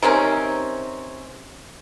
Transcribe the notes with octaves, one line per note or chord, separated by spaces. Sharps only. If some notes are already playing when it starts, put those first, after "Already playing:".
C3 D#3 C4 C#4